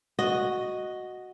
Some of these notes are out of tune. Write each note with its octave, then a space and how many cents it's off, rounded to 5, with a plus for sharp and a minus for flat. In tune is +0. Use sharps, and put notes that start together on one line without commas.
F#4 +0 D#5 +0